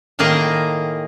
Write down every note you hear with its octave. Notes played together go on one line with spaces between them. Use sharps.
A2 D#3 A#3 G#4 D#5 A#5